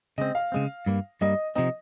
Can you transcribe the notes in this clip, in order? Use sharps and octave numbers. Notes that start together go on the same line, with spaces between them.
C#3 G#3 C4 D#5
F5
C#3 G#3 C4
G2 G3 A#3
G2 G3 A#3 D#5
C3 F3 C4 D#4 D#5